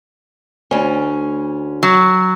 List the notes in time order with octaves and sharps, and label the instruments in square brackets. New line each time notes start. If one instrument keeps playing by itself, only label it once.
[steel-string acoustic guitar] D2 C#4
[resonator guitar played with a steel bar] F#3